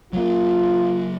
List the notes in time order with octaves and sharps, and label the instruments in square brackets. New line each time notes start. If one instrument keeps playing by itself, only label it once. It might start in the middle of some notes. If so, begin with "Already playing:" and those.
[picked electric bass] F#3 A#3 [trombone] F4